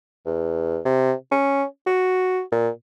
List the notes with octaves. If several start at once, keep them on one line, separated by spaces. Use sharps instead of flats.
E2
C3
C#4
F#4
A#2